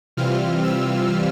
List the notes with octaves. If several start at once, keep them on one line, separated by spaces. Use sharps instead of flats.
C3 E3 G3 C4 F4 F6
E6